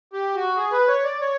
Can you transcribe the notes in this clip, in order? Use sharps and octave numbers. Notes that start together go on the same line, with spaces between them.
G4
F#4
G#4
B4
C#5
D5
C#5